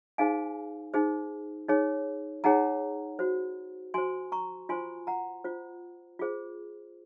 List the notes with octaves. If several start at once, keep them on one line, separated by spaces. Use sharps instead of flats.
D#4 G#4 C5 F5 G#5
D#4 G#4 C5
D#4 G#4 C#5
D#4 G#4 C#5 F#5 A#5
F#4 C5
F#4 C5 G#5 C6
A#5 C#6
F4 C5 G#5 C6
F#5 A#5
F4 C5
F4 G#4 C5